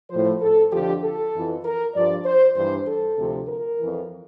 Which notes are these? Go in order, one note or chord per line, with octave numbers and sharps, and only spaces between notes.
A2 F3 C5
A4
F2 D3 F3 G4
A4
F2 E3
A#4
G2 F3 D5
C5
G2 E3 C5
A4
D2 C3 F3
A#4
F2 E3